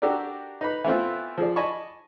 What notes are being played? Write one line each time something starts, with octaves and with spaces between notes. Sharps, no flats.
D4 F#4 G4 A4 A#4 D5
D#4 B4 B5
E3 A3 B3 C4 F4
F3 G#4 D5
D5 D#5 G#5 A5 B5 C#6